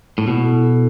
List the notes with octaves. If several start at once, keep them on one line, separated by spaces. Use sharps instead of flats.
A2
B2 E4
A4
A4